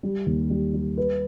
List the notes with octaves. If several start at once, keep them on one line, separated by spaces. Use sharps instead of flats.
G3
D#2
G3
G3
B4